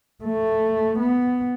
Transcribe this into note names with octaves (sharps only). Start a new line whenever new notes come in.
A3
B3